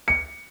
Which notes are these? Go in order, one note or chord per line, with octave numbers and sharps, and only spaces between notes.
C#7